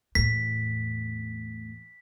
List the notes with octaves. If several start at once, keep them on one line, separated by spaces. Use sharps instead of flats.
E2 A2 B6